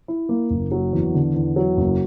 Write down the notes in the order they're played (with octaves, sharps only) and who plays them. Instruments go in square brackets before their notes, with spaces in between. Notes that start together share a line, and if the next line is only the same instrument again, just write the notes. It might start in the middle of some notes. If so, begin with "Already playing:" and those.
[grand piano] E4
A#3
F#1
F#3
E2
D3
E2
F#3
F#1